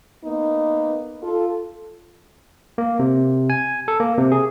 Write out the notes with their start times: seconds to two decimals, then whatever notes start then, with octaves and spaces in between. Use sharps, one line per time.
0.25 A#3 B3 D#4
1.23 F4 A4
2.78 A#3
2.99 C3
3.50 G#5
3.88 A4
4.00 A#3
4.18 C3
4.32 G#4